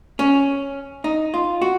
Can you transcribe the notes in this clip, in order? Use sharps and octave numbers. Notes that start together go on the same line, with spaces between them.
C#4
D#4
F4
F#4